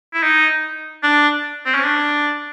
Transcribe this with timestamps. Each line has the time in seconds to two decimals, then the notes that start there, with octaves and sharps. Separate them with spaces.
0.13 E4
0.23 D#4
1.03 D4
1.65 C4
1.74 C#4
1.84 D4